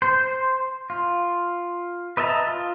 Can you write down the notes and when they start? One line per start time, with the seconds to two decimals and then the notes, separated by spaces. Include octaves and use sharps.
0.02 C5
0.90 F4
2.17 B4 D#5 E5 A5 A#5
2.47 F4